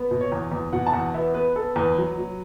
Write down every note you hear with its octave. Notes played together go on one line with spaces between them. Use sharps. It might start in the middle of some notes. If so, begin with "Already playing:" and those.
Already playing: B3
B2
C#5
E2
E2
B2 F#5
A5
E2 F#5
B3 E5
B3 B4
B3 A4
E2 B4
F#3
F#3